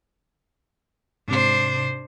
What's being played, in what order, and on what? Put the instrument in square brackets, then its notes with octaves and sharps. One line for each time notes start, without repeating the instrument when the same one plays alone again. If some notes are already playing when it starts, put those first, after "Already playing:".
[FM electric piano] G#2 C3 [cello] D4 C5